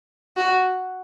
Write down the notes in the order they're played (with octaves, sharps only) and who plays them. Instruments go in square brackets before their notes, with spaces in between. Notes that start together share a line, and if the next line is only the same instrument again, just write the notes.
[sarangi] F#4